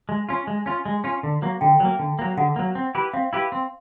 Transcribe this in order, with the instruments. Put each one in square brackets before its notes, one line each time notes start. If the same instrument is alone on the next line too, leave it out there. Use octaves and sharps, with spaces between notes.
[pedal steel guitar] G#3
C#4 F4
G#3
C#4 F4
G#3
C#4 F4
D3
F#3 A#3
[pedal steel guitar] D3 [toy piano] G5
[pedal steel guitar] F#3 A#3
D3
F#3 A#3
[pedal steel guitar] D3 [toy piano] F#5
[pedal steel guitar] F#3 A#3
C4
E4 G4 B4
[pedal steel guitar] C4 [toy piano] F5
[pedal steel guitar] E4 G4 B4
C4